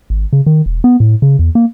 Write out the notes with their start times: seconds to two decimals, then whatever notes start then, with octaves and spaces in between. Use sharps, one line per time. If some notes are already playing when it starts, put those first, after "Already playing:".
0.10 G#1
0.33 C#3
0.46 D#3
0.66 E1
0.84 B3
1.00 A2
1.22 C#3
1.39 E2
1.55 A#3